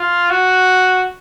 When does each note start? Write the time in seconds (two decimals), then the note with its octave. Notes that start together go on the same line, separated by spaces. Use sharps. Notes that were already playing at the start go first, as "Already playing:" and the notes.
Already playing: F4
0.30 F#4